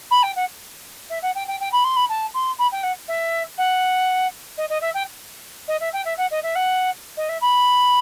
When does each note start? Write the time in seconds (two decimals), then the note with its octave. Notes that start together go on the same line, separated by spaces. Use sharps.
0.11 B5
0.23 G5
0.36 F#5
1.10 E5
1.22 F#5
1.35 G5
1.47 G5
1.60 G5
1.72 B5
1.84 C6
1.96 B5
2.09 A5
2.34 C6
2.58 B5
2.72 G5
2.83 F#5
3.08 E5
3.57 F#5
4.57 D#5
4.69 D#5
4.81 E5
4.94 G5
5.68 D#5
5.80 E5
5.93 G5
6.05 E5
6.17 F#5
6.31 D#5
6.43 E5
6.55 F#5
7.17 D#5
7.29 E5
7.41 B5